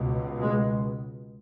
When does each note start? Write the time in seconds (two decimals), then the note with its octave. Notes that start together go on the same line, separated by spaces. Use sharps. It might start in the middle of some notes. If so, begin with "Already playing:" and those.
Already playing: C#2 B2
0.41 G#3